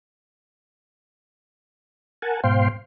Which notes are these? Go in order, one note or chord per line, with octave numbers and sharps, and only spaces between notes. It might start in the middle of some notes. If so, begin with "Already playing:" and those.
A#4 F#5 G#5 A5
G#2 B2 C5 F5 G5 C6